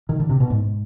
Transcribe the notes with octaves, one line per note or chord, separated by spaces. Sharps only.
D#3
D3
C3
B2
G#2